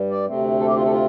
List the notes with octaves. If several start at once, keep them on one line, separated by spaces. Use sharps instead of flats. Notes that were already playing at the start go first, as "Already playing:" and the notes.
Already playing: G2 G3
D5
D2 C3 A3 C4
A4
G4
F4
A4
F4